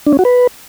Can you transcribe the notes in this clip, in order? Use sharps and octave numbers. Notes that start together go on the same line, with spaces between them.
D4
C#4
F#4
B4